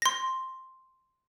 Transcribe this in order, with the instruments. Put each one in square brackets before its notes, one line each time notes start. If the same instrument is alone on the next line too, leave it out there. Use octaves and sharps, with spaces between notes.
[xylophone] C6 A#6